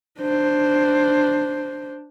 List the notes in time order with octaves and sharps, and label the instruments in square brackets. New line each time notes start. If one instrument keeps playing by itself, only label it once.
[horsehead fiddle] D4 C5